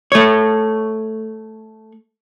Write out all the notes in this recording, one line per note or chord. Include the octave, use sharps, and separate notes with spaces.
A3 C#5